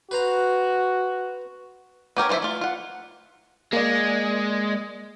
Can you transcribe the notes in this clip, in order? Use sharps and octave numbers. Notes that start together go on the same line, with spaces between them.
F#4 B4 C5 A#5
B3 G4 A#4 C#5
E3 F3 F4 C5 E5
A3 F4
F4 F#5
G#3 A#3 D5